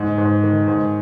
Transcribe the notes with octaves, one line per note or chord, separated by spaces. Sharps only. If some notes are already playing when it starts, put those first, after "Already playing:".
Already playing: G#2
G#2
D#3
G#2